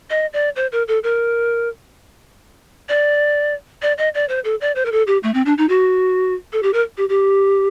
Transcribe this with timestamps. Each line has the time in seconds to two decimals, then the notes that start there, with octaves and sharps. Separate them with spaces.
0.10 D#5
0.33 D5
0.56 C5
0.72 A#4
0.88 A4
1.03 A#4
2.89 D5
3.82 D5
3.98 D#5
4.14 D5
4.29 C5
4.44 A4
4.61 D5
4.75 C5
4.85 A#4
4.92 A4
5.07 G4
5.23 A3
5.34 C4
5.46 D4
5.58 D#4
5.69 F#4
6.53 A4
6.63 G4
6.73 A#4
6.97 G4
7.09 G4